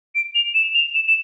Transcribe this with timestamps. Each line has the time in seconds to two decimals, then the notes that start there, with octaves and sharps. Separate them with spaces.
0.15 D7
0.35 F7
0.55 E7
0.74 F7
0.94 E7
1.08 E7